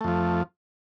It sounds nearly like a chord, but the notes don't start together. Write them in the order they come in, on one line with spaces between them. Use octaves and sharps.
A3 F2 F3